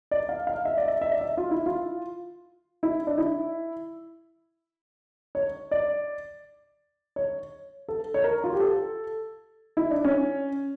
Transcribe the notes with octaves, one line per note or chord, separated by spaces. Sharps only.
D5
F5
F5
E5
D5
E5
E5
D5
E5
F4
E4
F4
E4
D4
E4
C#5
D5
C#5
A4
C#5
A#4
F4
G4
A4
E4
D4
C#4